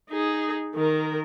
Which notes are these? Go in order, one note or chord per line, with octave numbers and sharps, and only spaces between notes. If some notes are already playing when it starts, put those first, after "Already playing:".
D#4 G#4
D#3 A#4